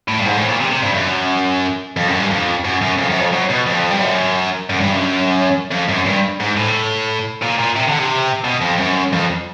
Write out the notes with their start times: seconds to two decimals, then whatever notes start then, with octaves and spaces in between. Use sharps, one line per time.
0.08 A2
0.19 G2
0.26 G#2
0.37 A2
0.49 A#2
0.60 C3
0.71 C3
0.82 G2
0.94 F#2
1.97 F2
2.07 F#2
2.19 G2
2.31 F2
2.64 F#2
2.81 F#2
2.99 F2
3.10 F#2
3.21 F2
3.33 F#2
3.50 B2
3.67 F2
3.91 G2
4.01 F#2
4.70 F#2
4.81 G2
4.92 F#2
5.71 F2
5.89 F#2
6.06 G2
6.40 G#2
6.57 A2
7.42 A#2
7.59 A#2
7.76 C3
7.88 D3
7.99 C3
8.44 B2
8.62 F2
8.78 F#2
9.13 F2